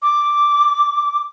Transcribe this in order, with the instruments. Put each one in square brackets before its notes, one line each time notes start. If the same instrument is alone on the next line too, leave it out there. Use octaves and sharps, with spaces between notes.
[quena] D6